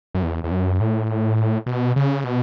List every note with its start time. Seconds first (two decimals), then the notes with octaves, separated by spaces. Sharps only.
0.14 F#2
0.23 E2
0.44 E2
0.52 F#2
0.80 A2
1.66 B2
1.96 C#3
2.24 B2